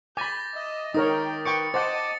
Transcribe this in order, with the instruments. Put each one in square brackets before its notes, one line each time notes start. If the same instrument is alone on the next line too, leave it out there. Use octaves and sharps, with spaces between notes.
[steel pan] G#5 B5 [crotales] D6 A6 A#6 [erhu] G6
[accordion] D#5 [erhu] E5
[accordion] D#3 [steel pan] D#4 A#4 C#5 [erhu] G5 [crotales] D#6
[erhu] B4 [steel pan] G5 C#6 D6 [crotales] C#7
[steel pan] C5 F#5 [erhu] D#5 [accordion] A5 D6 [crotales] A6